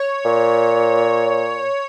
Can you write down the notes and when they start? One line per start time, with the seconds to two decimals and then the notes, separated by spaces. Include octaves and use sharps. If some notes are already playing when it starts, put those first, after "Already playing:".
Already playing: C#5
0.25 A#2